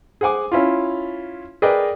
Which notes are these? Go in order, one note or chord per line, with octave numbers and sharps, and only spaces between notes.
G#4 C5 F#5 G#5 D6
C#4 E4 F4
G#4 A#4 B4 D5 D#5 G5